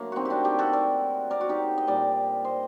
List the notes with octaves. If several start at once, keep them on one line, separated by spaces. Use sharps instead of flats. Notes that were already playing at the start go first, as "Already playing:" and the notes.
Already playing: D3 F#3 A3 A#3
C4 D#4 F#4
D4 F#4 G4
D#4 G4
F#4 A4
A#4 D5
A#4 D5
F#4
D#4 G4
D#5
A#2 G3 A#4 D5
C5 D#5